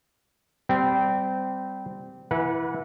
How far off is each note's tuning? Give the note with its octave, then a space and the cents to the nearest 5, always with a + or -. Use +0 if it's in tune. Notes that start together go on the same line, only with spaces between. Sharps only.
G3 -5 C4 -20
E3 +0 B4 -35 F#5 -15